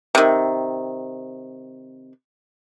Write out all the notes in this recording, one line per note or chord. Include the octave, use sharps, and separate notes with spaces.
C3 D#3